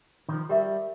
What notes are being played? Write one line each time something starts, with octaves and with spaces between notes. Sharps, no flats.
D#3 F3
G3 G4 A#4 E5